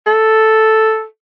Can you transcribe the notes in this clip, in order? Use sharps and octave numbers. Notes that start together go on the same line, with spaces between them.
A4